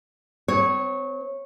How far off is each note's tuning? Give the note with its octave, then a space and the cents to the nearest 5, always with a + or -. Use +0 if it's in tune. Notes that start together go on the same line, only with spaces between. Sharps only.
C4 -30 C#5 -10